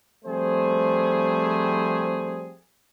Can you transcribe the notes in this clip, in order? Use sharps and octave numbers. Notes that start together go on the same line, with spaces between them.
F3 G3 A3 C4 G#4 C5